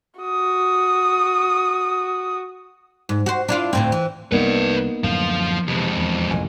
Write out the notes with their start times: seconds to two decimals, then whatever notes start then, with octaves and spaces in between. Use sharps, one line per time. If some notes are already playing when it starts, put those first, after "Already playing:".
0.20 F#4 D#6
3.09 G#2
3.26 F#4 C5
3.48 D4 E4 F4
3.73 D2 A2 C4
3.92 E3
4.32 C2 A#3 B3 D#4 B4 D5
5.04 D1 F#2 A2 F3 F5
5.68 F2 C3 E3 G#3
5.97 E2
6.31 A1 F2 C3 D#3 G#5